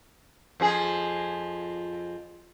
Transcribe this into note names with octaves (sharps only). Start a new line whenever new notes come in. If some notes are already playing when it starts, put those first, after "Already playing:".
F2 F3 G#4